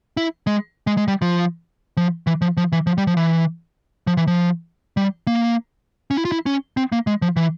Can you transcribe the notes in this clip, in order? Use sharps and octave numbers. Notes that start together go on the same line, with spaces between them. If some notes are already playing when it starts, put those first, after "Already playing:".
E4
G#3
G#3
G#3
G3
F3
F3
E3
F3
F3
E3
F3
G3
F3
E3
F3
E3
F3
G3
A#3
C#4
E4
F4
E4
C#4
C4
A#3
G#3
F3
E3